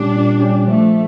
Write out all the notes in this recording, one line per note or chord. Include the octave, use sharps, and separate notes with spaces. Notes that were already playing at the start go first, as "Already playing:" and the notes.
Already playing: A#2 G3 C#4 D4 G4
A#2
G3 C#4 G4
F3 A3